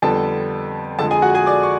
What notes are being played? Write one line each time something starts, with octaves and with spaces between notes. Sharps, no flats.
F2 D3 G3 B3 A4 A5
F2 D3 F3 G#3 A4 A5
G#4 G#5
F#4 F#5
G#4 G#5
D5 D6
C#6